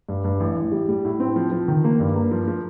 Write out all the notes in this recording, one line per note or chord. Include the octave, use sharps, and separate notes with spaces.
G2
G2
A1
A1
G3
G3
A2
C4
F3
F3
D#3
A#3
G2
A#3
F3
F3